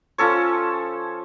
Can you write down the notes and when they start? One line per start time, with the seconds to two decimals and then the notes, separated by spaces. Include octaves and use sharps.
0.18 F3 C#4 A4 C#5